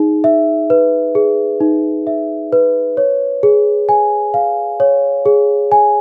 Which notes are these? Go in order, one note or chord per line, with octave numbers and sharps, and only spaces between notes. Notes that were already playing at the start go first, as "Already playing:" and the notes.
Already playing: D#4 G#4
E5
B4
G#4
D#4
E5
B4
C#5
G#4
G#5
F5
C#5
G#4
G#5